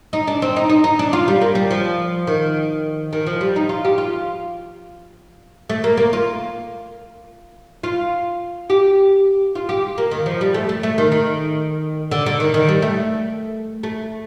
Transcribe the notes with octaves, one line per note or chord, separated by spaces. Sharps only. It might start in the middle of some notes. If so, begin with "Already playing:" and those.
D#4
D4
C4
D#4
D#4
D#4
D4
F4
G3
A#3
G3
F3
D#3
D#3
F3
G3
D#4
F4
G4
F4
A3
A#3
A#3
F4
F4
G4
F4
G4
A#3
D#3
F3
G3
A3
A3
A3
D#3
D#3
D3
D3
D#3
D#3
G3
A3
A3